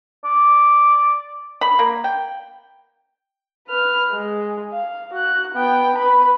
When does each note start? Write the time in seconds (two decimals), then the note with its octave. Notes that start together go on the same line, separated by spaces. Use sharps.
0.25 D5
1.61 B5
1.79 A#3
2.04 G5
3.68 B4 F6
4.11 G#3
4.72 F5
5.13 F#4 F#6
5.54 B3 G5
5.96 B4 B5